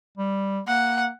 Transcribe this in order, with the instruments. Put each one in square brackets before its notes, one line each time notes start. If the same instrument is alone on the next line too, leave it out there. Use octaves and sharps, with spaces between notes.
[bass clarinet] G3
[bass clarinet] A#3 [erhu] F#5